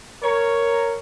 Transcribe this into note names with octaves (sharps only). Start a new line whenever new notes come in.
A#4 C#5